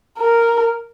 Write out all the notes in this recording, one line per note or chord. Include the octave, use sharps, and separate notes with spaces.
A#4